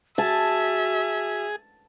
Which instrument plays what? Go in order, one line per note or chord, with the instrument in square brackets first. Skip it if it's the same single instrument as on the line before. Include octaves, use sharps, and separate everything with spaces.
[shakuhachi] F#4 [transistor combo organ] G#4 [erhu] E5 [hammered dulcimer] A5